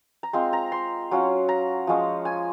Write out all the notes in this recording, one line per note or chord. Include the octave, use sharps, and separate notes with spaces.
A#5
G#3 C4 F4 C6
A#5
C6
F#3 C#4 F4
A#5
F3 G#3 C#4
G#5